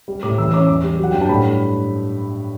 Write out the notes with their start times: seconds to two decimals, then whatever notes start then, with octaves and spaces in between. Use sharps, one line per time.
0.08 G3
0.23 A2 D6
0.38 E3 E6
0.53 C#4 D6
0.68 E2 D6
0.84 G3
0.99 F#3 F#5
1.12 G2 G5
1.21 A5
1.29 A2 B5